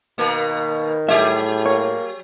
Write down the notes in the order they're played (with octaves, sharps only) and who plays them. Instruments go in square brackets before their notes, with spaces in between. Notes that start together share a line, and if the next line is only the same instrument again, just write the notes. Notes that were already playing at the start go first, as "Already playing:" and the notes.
[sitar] B2 A#3 [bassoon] D#3
[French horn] A2 [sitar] F#3 G4 G#4 [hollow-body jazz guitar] E5
[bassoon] A#3 [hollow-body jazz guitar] C#5